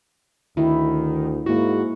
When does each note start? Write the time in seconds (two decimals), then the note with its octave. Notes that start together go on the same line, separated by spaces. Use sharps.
0.57 D2 D#3 E4
1.46 G#2 A#3 E4 F#4